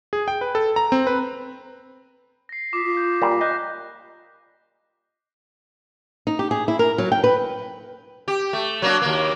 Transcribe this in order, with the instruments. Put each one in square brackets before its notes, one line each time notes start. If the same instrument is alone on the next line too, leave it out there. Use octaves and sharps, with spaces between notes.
[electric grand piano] G#4
G5
B4
A4
A#5
C4
B4
[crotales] A#6 C7
[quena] F4 [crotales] D6 D#6 B6
[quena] F4
[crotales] G6
[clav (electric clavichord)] A#2 G3 [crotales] A#6
[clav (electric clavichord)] D#5 [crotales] F#6 G6 A#6
[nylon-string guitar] D#4
G4
G#4
E4
A#4
F#3
G5
B4
[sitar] G4
A3
F#3 A#3 D4
D#2 A#3